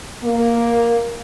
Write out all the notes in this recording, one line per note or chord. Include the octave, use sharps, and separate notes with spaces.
A#3